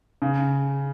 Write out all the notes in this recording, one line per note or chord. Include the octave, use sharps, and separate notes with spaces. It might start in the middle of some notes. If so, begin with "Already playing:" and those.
C#3